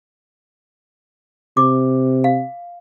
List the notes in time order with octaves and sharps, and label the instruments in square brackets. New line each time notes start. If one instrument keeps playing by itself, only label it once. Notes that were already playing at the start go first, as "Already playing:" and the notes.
[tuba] C3 [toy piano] D6
[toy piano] F5